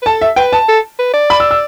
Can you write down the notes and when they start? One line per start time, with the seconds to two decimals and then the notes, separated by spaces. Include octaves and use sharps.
0.02 B4
0.06 A4 A5
0.21 E5
0.36 B4 G5
0.53 A5
0.68 A4
0.99 B4
1.14 D5
1.30 B5
1.40 E6
1.51 E6